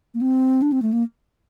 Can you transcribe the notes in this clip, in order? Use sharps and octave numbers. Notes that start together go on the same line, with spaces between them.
A#3
C4
D4
C4
A3
A#3